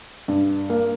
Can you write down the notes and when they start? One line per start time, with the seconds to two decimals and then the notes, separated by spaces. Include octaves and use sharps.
0.28 G2
0.70 A#3